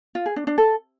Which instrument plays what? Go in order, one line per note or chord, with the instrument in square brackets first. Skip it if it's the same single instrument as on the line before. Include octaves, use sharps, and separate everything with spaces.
[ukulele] F4
G#4
D4
D4
A4